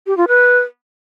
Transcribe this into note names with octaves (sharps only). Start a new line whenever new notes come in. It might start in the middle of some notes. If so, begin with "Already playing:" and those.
G4
F4
B4